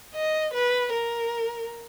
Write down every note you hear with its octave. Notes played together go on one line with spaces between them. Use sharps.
D#5
B4
A#4